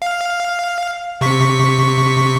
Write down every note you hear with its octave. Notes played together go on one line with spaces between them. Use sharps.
F5
C3 C#6 B6